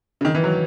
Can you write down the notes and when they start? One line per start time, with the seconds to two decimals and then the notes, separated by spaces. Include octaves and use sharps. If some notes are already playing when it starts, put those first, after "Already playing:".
0.21 C#3
0.25 D#3
0.35 E3
0.44 F#3